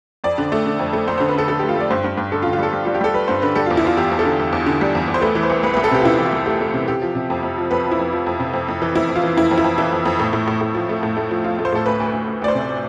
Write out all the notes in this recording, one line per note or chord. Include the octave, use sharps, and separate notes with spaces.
F2 D5
D3
A3
D3
F2
A3
F2 C5
D3 C5
B4
D3 A4
D3 A4
A3 G4
F4
A3 D5
G2 C5
G2
G2
D3 A4
F4
D3
F4
G3 A4
G3
G3 F4
G4
G3 A4
G3 B4
G2 C5
D3 B4
G3 A4
E2 F4
E4
E2 F4
E2 G4
E2
A4
D3
E2
E2
D3
G3
E2
E2
C5
A3 B4
E3
C5
C2
C2 B4
C2 B4
A4
C3 G4
F4
C3 E4
E3
F4
C2
A3 G4
A3
C3
C3 G4
F3
C3
F2
F2
F3
F2 B4
F3
E4
F2
F3
F2
C3
F2
F2
E3
F2 E4
F2
F4
E3
F2 E4
F2
E4
F2
E3 E4
F2
F2
A2
A2
A2
A2
F3
A3
A2
A3
F3
F3 F4
A3
C5
A2 A4
D2 B4
D2
B4
D2
D2
D2 D5
C5
C3